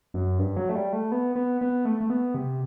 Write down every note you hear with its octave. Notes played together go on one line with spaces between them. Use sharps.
F#2
G2
F#3
A3
G3
A3
B3
B3
B3
A3
A3
B3
C3